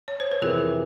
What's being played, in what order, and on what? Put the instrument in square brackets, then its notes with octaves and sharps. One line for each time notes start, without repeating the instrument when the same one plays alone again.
[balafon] C#5
C5
B4
[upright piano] F2 C3 E3 [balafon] G#4 A#4